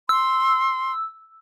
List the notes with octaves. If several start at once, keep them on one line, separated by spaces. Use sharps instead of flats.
C6 E6